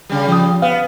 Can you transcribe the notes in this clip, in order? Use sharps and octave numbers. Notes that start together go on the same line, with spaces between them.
C#3 G3
F3 D#6
B3 F5